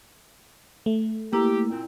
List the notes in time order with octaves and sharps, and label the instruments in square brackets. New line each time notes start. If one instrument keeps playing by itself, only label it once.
[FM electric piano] A3
[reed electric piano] A#3 [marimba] E4 A#5 [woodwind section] G4
[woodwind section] A#2 C4